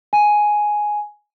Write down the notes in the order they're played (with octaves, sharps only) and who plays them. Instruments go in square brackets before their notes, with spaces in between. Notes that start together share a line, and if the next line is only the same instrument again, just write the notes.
[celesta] G#5